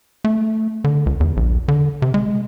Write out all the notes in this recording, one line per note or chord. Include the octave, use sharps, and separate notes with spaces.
A3
D3
C#2
E2
A#1
D3
C3
G#3